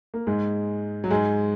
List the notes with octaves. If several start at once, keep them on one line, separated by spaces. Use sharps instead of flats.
A#3
G#2 G#3
F#3
G#2 G#3